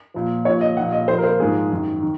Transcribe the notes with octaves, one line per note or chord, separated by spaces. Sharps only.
A#2 F3
A#2 F3 C#5
D#5
A#2 F3 F#5
D#5
A#2 F3 C5
A#4
C5
G#2 F3 G#4
F#2 D#3
D#3